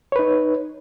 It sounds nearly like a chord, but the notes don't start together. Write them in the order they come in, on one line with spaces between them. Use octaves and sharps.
C#5 B4 D#4